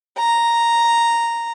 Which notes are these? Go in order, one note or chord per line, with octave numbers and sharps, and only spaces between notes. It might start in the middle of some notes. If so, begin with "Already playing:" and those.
A#5